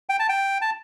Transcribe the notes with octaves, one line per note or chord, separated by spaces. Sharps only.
G5
A5
G5
A5